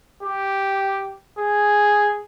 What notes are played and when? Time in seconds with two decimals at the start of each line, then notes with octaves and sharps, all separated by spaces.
0.23 G4
1.39 G#4